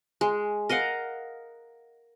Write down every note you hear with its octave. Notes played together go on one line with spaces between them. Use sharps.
G#3
A#4 D#5 F5 F#5